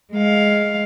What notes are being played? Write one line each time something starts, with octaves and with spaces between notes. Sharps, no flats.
G#3 F5